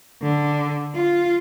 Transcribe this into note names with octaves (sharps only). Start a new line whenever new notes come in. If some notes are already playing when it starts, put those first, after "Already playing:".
D3
F4